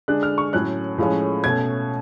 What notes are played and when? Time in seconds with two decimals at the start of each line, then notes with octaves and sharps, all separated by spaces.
0.08 D3 G#3 D4 F#6
0.23 F6
0.38 C#6
0.53 A2 F#3 C#4 F#6
0.98 A2 F3 G#3 C#4
1.44 B2 A3 C#4 G#6